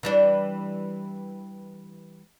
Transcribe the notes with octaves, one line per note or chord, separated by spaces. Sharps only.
E3 G3 D4